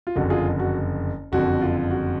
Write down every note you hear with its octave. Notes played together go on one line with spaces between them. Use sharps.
F4
F#1 F2 D3 F#4
F4 G#4
F#4
F#1 F2 D3 F#4
F4
F#4